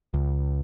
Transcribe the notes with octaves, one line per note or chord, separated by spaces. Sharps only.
C#2